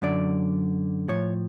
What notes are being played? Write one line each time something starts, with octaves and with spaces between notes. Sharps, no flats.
F#2 D3 F#3 D5
A2 F3 C#5